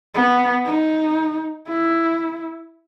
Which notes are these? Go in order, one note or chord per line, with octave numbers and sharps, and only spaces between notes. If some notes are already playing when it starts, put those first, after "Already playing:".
B3
D#4
E4